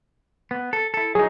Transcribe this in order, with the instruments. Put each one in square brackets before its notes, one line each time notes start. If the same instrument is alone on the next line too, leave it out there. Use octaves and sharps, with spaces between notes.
[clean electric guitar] B3
A4
E4 A4
[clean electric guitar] F#3 D#4 [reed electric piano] G#4